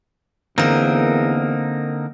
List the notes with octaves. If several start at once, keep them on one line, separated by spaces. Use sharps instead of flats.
E2 D3 A#3 C4 D#4 A#4